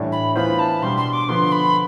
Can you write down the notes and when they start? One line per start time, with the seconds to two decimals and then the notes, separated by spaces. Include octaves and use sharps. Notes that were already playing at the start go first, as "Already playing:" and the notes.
Already playing: A2 E3 G3 D4
0.12 B5
0.36 E3 B3 F4 C5 B5
0.59 A5
0.82 B2 G3 D4 G4 C6
0.97 C6
1.13 D6
1.29 D3 F3 B3 C6
1.52 B5